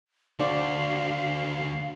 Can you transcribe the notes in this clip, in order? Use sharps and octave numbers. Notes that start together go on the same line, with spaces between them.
D2 D4 F#4 C5 D5 F5